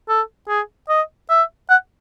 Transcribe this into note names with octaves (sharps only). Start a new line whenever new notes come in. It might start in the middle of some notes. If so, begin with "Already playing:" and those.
A4
G#4
D#5
E5
F#5